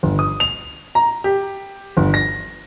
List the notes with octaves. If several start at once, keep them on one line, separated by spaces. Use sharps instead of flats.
G1
D#6
F7
A#5
G4
G1
A#6